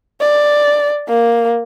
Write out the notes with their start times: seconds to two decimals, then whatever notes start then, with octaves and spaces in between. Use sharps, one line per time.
0.21 D5
1.08 A#3